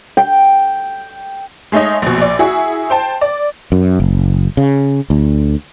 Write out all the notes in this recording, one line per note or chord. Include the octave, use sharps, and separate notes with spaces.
G5
G#3 A3 D#4 C#5 D#5
A#1 B2
A#1 D5
E4 F#4 G#4
C5 G5 A5
D5
F#2
F#1
C#3
D2